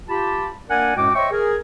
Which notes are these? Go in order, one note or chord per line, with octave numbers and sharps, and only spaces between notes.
F4 G4 A5 B5
A#3 D4 A#4 D5 F#5 G#5
F#2 A2 G#3 F#4 G5 D6
C5 C#5 D#5 E5 G5 C#6
G#4 A#4